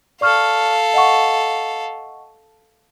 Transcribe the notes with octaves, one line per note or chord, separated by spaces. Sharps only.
A4 D5 F5 C#6 F6
D#5 F#5 C#6